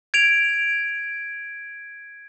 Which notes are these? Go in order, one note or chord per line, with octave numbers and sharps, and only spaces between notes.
G#6 D7 F7